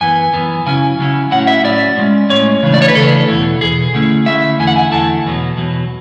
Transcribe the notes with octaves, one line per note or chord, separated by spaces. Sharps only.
F#2 E3 B3 G#5
F#2 E3 B3
C#3 F#3 C#4 E4 G#5
C#3 F#3 C#4 E4
A2 F#3 C#4 E4 F#5
E5
A2 F#3 C#4 E4 D5
A2 G#3 C#4
A2 G#3 C#4 C#5
C#3 E3 A3 D4
D5
C#5
B4
C#3 E3 A3 D4 A4
E2 B2 A3 E4
E2 B2 G#4
D3 A3 C#4 E4
D3 A3 C#4 E4 E5
E2 D3 A3 E4 G#5
F#5
G#5
E2 D3 A3 E4 A5
E2 B2 F#3
E2 B2 F#3